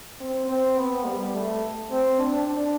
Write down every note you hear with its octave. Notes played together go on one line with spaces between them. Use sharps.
C4
C4
B3
G3
A3
C4
D4
D4